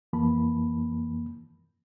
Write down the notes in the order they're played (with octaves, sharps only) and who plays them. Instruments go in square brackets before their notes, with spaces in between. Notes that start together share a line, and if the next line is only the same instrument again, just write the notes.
[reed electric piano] F2 E3 A#3 A5 B5